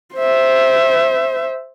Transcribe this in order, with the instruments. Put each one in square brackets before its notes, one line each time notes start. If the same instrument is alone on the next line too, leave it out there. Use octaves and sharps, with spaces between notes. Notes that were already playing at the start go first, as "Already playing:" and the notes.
[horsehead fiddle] C5 E5